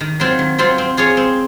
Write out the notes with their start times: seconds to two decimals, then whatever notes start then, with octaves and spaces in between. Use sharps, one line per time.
0.01 D#3
0.20 F#3 C4 F4 C5
0.39 D#3
0.58 F#3 C4 F4 C5
0.78 C4
0.97 F4 G#4 C#5
1.17 C4